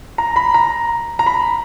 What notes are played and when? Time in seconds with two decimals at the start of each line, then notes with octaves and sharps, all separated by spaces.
0.18 A#5
0.36 B5
0.54 A#5
1.19 A#5
1.26 B5